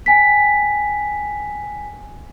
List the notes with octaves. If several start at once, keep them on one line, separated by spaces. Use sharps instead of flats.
G5 G#5 B6